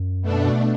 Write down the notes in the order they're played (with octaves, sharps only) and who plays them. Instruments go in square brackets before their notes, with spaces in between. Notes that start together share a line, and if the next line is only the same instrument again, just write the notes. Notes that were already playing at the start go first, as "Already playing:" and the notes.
Already playing: [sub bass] F#2
[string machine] B2 A3 D4